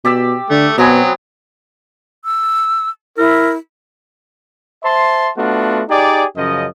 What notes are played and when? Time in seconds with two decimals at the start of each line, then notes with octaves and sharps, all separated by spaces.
0.05 B2 G4 D5 E6
0.50 D3 A3
0.78 B2 F#3 B3 C4 G#5
2.25 E6
3.18 E4 A#4
4.83 C5 E5 A5 C6
5.37 A3 B3 D4 F4 F#4
5.89 D#4 G4 G#4 D5
6.36 F#2 C#3 F3 D#5